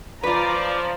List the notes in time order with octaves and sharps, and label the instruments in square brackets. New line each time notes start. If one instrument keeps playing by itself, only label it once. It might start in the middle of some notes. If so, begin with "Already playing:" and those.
[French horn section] F3 [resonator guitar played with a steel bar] F4 B4 [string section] D5 A#5